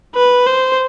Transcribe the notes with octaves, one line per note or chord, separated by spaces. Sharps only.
B4
C5